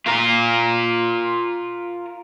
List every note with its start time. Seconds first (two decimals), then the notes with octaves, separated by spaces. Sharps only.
0.07 F4 A#4